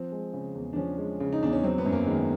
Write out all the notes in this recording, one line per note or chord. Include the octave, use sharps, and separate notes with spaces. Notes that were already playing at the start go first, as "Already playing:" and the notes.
Already playing: F3 C4
G#3
C#3
E2
D4
F3 C#4
G#3
C#3
D#4
E2 D4
C#4
F#3 C4
B3
F#2
A#3
D#3 G#3